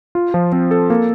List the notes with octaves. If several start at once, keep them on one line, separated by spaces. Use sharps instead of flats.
F4
F3
C4
A4
A#3